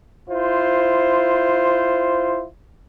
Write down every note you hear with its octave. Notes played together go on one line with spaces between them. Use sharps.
E4 F4 C5